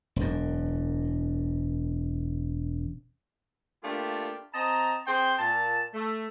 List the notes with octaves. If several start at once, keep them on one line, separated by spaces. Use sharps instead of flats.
E1 F#2
A3 A#3 D4 F4 G4
C4 D#5 A5 A#5
C4 G#4 G5 C6
A#2 A5
A3